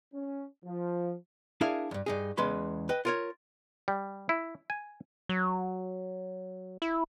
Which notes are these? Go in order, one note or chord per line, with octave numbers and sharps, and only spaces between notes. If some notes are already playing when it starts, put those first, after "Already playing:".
C#4
F3
D4 E4 G#4 A#4 E5 F5
E2 G2
G2 D#4 G#4
E2 C#3 G#3 B4 B5 C6
B4 D#5 G5
F4 A#4 C#5
G3
E4
G#5
F#3
E4